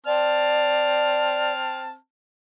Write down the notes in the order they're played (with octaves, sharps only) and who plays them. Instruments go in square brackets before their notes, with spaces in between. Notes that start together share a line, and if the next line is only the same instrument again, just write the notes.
[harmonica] C4 A5 F6 [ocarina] D5